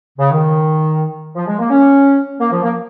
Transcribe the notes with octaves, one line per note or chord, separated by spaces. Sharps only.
C#3
D#3
F3
G#3
A#3
C#4
A#3
F3
A#3